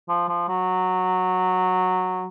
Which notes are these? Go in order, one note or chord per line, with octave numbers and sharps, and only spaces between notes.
F3
F3
F#3